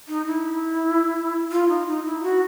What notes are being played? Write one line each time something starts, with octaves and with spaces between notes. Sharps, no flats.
D#4
E4
F4
D#4
D#4
E4
F#4